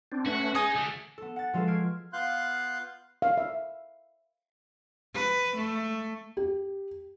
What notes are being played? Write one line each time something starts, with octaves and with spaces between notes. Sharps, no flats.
C4 D4
A3 C#4 F#4 B4
D#4 G#4 G#5 D#6
D3 A3
B3 A4
F#5 A6
F3 G#3 F4 F#4 A4 B4
F6 G#6 C7 D7
B3 F4 F5 C6 F#6 G6
F5
E5
B4
A3
G4